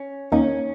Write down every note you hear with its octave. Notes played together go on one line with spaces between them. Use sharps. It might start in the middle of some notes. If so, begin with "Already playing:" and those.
Already playing: C#4
D#2 D#3 A#3 C#4 D#4